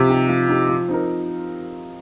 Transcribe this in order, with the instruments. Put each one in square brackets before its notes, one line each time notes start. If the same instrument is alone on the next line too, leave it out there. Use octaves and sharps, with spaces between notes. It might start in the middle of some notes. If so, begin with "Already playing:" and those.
Already playing: [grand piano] C3 [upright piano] F3
[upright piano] D#4 G4
F3
D#4 G4
F3
C4 D#4 A#4